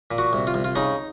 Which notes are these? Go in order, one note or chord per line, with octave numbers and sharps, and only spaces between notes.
A#2
F#4
C2
F4
C2
F4
C#3 D#4